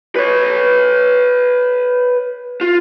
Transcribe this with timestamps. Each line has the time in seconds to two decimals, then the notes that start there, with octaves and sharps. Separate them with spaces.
0.16 B4 C#5
2.61 F4